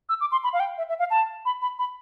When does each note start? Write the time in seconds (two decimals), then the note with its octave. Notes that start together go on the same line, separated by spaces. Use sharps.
0.09 E6
0.21 D6
0.32 C6
0.44 B5
0.53 F5
0.60 G5
0.78 E5
0.89 E5
0.99 F5
1.11 A5
1.45 B5
1.62 B5
1.79 B5